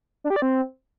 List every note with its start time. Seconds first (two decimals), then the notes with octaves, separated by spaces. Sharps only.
0.24 D4
0.30 G4
0.36 D5
0.42 C4